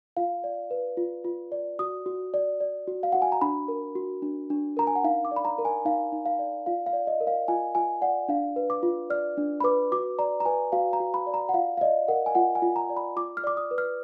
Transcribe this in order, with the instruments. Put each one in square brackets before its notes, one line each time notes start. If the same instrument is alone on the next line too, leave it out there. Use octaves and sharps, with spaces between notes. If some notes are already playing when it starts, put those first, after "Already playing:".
[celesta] F4 F5
D5
B4
F4
F4
D5
F#4 D#6
F#4
D5
D5
F#4
F5
F#4 F#5
G#5
A#5
D4 B5
A#4
F#4
D4
D4
A#4 A#5
G#5
F#5
D#4 F5
D6
D5
B5
A#5
A#4
G#5
D#4 F5
D#4
F5
D5
F4 F5
F5
D5
D#5
A#4
F5
F4 G#5
F4 G#5
D5 F#5
D4 F5
B4
D6
F4
D5 F6
D4
B5
B4 D6
F#4 D6
D5 A#5
A#5
B4 G#5
F#4 F5
A#5
F#4
B5
D5
A#5
F#5
F4 F5
F5
D5 D#5
A#4 F#5
G#5
F4 F#5
G#5
F4
A#5
D5
B5
F4 D6
F6
D5 D6
D#6
B4
F6